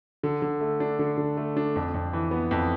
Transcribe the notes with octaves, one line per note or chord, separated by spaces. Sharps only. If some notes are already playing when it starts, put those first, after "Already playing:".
D3
D3
A3
D4
D3
D3
A3
D4
F2
F2
E3
B3
F2